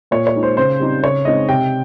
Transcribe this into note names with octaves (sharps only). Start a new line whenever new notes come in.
A#2 C#5
C#5
G#3 D#4
C5
C#3 C5
G3 C4 D#4
C#3 C#5
G#3 C4 D#4 D#5
C3 G5